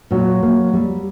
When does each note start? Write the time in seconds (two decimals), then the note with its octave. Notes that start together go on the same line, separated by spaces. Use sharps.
0.11 A#2 F#3
0.43 A#3
0.73 G3